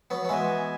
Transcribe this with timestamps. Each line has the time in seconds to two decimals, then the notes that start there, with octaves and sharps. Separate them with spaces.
0.10 F#3 B3
0.25 F#3
0.29 E3 G#3 B3 F#4 E5 G#5